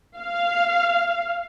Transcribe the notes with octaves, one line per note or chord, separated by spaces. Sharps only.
F5